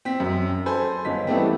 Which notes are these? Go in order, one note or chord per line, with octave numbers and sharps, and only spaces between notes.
C4 B6
F#2
A4 C5 G#5 B5
G1 C#4 D#4 B6
E3 G3 A3 B3 C4